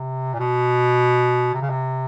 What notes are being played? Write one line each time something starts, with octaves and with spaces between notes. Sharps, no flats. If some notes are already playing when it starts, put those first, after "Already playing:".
Already playing: C3
A#2
B2
C3
C#3
C3